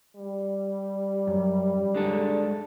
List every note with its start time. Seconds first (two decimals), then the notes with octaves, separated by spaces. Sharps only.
0.16 G3
1.27 F#2
1.94 G#3 D4 A4